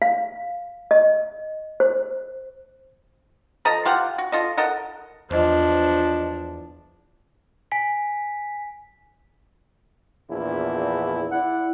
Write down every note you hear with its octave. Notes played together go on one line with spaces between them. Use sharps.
F5
D#5
C5
F3 A4 D#5 A#5
F4 G4 F5 F#5
F#4
F4 A4 D#5
A4 A#4 D#5 F#5
E2 F3 D4 C5 D#5
G#5 B6
A#1 E2 E4
E4 D5 F#5